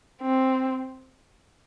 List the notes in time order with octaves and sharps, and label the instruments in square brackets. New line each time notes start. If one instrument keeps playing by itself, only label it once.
[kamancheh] C4